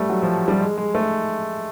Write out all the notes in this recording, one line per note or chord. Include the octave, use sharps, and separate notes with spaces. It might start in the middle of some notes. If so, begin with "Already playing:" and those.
Already playing: G3 A3
F#3
F3
G3
G#3
G#3
A3